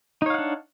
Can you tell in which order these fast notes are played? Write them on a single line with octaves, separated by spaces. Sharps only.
D#4 C#5 F5 F#5 D4